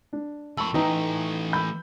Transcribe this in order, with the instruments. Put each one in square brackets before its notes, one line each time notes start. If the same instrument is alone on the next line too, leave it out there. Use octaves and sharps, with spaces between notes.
[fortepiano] D4
[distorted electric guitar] F2 B5 [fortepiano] A5 C#6 [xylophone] E6
[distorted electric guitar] E3 A3 [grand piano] D#4 [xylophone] B4 G5 A#5
[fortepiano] B5 E6 [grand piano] G6